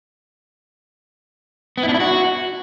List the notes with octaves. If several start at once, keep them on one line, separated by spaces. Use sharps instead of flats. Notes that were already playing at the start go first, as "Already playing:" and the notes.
B3
E4
D4
E4
F#4